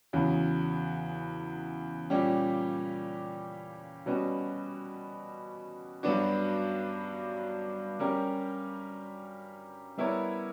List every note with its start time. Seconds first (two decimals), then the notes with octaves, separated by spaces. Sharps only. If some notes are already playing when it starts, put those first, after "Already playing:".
0.13 E2 C#3 F#3
2.10 A#2 G3 C#4 G4
4.06 B2 G3 C#4 F#4 B4
6.03 G2 F#3 B3 D4 F#4
8.00 G3 C#4 G4 A#4
9.97 G3 B3 E4 A#4 C#5